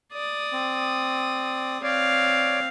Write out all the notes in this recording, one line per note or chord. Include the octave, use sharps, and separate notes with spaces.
D5 D#6
C4
C4 C#5 D5 F5